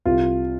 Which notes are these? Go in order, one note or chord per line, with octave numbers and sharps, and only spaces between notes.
C2 F4